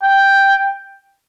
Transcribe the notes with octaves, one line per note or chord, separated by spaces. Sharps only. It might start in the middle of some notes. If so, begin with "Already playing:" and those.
G5